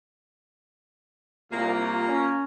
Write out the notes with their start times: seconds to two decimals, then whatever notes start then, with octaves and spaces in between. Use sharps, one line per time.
1.52 C2 A#3 F4
2.08 C#4